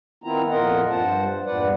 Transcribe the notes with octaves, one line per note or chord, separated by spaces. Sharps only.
D#3 B3 C4 E4 F4 A#5
F2 A#2 F4 A#4 D#5 F#5
G2 C5 F#5 A5
E2 G2 A#2 B4 D5 F#5